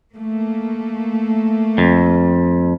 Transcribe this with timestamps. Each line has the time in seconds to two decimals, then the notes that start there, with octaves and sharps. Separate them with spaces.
0.13 A3 A#3
1.78 F2